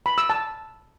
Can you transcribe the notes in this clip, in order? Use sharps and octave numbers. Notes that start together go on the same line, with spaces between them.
B5
E6
A5